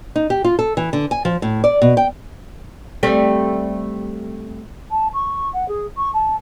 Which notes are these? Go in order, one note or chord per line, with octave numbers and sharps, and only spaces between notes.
D#4
G4
F4
A4
E3
D3
G#5
F3
A2
D5
B2
G5
G3 A3 C4
A5
C#6
F#5
G#4
C#6
A5